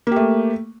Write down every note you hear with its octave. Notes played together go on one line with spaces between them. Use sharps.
A3 A#3 G4